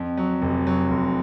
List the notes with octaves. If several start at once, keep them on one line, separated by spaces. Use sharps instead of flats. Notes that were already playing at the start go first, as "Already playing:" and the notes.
Already playing: F2
F#3
F1
F#3
F1